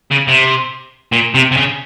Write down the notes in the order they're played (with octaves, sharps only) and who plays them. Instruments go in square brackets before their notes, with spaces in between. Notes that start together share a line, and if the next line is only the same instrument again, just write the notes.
[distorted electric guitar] C#3
C3
A#2
C3
C3
C#3